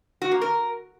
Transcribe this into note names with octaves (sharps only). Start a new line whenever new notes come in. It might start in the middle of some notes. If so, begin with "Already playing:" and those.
F#4
A#3
A#4